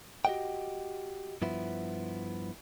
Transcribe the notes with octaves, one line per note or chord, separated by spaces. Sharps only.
F#4 G4 A4 D#5 F#5 G5
G2 F3 B3 E4